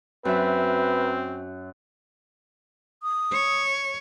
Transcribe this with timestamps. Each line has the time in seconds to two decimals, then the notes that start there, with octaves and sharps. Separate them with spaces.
0.25 F#2 C4 B4 E5
3.03 D#6
3.33 C#5